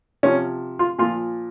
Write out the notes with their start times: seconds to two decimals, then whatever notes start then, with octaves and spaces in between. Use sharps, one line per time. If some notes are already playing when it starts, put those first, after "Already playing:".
0.23 C3 F3 C#4
0.79 F4
0.98 A#2 F3 F4